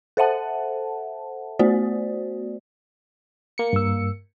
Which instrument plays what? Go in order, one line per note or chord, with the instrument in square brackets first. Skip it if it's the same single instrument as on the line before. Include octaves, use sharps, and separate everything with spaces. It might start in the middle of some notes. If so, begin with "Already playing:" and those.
[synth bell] A4 C5 E5 F#5 A5
A3 B3 F#4 C5 D5
[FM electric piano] A#3 C#7
[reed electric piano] G2 E6